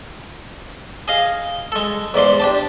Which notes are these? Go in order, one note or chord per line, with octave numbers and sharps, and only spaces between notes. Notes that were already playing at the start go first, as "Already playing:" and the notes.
G#4 D#5 F5
G#3 A4
E2 G#2 D5 C6
D4 G4 A5